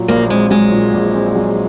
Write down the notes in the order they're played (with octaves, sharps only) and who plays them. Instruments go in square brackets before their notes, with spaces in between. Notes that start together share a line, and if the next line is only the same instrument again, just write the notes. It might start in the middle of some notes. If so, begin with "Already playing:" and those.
Already playing: [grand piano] A#2 F#3
[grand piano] A#1 [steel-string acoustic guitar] A#3
[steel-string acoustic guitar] G#3 [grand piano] C4
[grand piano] F#3 [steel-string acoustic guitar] G#3
[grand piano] A#2
A#1
C4
F#3